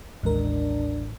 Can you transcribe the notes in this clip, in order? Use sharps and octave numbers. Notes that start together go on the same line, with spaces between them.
A1 D#2 G#3 D4 A#4